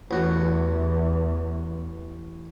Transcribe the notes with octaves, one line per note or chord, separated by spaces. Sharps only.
A1 E2 F#4